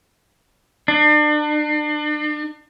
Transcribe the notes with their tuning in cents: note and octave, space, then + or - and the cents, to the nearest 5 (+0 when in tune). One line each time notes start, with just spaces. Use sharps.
D4 +35